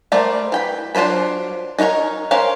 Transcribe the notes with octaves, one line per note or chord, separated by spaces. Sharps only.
G3 A3 A#4 C5 D5
E3 G5 B5
F#3 D4 F4 C5 B5
D#4 E4 F#4 A#4 C#5
C#4 A#4 C5 C#5 F5